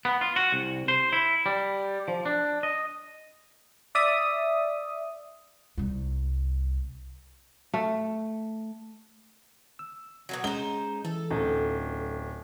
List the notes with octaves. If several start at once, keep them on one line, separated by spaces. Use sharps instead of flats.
B3
F4
F#4
C2
C5
E4
G3
F3
D4
D#5
D5 E5 D#6
C2 G3
A3
E6
B2 D3 F#3
G#3 C#4 D#4 G#4 C5 G7
E3 A4
D1 C#4 D#4 F4